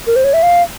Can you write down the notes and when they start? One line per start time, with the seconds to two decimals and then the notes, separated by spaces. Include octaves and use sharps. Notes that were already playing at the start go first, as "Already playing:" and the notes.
0.07 A#4
0.16 C5
0.24 C#5
0.34 E5
0.43 F5